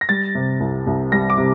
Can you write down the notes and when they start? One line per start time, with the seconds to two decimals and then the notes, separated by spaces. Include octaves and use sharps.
0.01 A#6
0.09 G3 A6
0.35 C3
0.60 C2
0.87 C2
1.12 G3 A#6
1.30 D6
1.38 C3